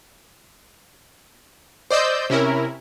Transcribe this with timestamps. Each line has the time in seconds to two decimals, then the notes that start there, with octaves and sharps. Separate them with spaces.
1.91 C5 D5 D#5 E6 G6
2.30 C3 C#4 E4 A#4